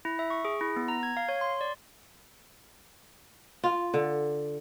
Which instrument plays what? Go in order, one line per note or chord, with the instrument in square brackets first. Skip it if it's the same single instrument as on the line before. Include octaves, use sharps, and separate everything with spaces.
[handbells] E4
E5
C#6
G#4
E4
B3
A#5
G#6
F5
C#5
C6
D5
[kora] F4
D3